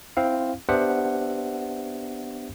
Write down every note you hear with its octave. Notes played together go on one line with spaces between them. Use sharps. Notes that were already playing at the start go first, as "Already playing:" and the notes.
C4 E4 F5
B3 D4 G4 C5 E5 F#5